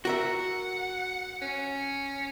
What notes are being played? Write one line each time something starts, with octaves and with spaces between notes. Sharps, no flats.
F#4 A#4 E5 F#5
C#4